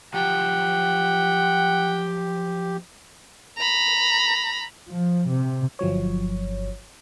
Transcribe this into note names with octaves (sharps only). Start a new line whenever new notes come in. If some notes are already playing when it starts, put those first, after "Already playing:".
F3 F#3 G4 F#5 G5
A#5 B5
F3
C3
G1 F3 F#3 C#5